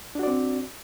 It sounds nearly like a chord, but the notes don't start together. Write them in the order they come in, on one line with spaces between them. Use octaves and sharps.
D4 F#4 D5 C4